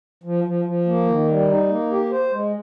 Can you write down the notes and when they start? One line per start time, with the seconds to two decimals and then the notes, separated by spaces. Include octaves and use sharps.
0.23 F3
0.44 F3
0.65 F3
0.86 A#3
1.06 D#3
1.27 G3
1.47 D#4
1.69 A#3
1.90 G4
2.10 C5
2.31 G#3